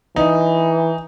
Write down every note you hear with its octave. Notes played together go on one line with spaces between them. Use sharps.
E3 D#4